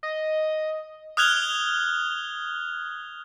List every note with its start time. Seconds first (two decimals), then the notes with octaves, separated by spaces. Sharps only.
0.03 D#5
1.17 D#6 F6 F#6 G#6 F7 G7